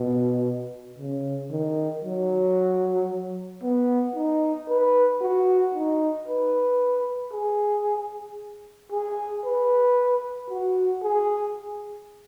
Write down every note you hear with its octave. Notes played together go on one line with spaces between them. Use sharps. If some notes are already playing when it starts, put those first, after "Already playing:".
Already playing: B2
C#3
D#3
F#3
B3
D#4
B4
F#4
D#4
B4
G#4
G#4
B4
F#4
G#4